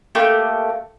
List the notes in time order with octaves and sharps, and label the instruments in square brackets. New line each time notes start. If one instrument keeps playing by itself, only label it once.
[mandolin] A3 A#3 G4